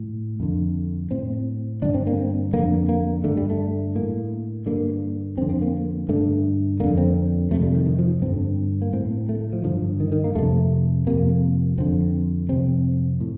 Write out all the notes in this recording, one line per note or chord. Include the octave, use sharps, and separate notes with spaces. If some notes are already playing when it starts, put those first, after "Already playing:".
Already playing: A2
F2 D3
A2 C4
G2 D3 D4
C4
A#3
C4
F2 D3 A#3
A#3
G2 D3 A3
G3
A3
A2 A#3
G2 D3 A#3
F2 D3 C4
C4
A#3
G2 D3 A3
F2 D3 A#3
C4
F2 C3 A3
G3
D#3
D#3
F3
G2 D3 C4
A#3
A2 C4
A3
F3
G2 D3 F3
D#3
D#3
A#3
F2 C3 A3
F2 C3 A#3
F2 D3 C4
F2 C3 C4
A2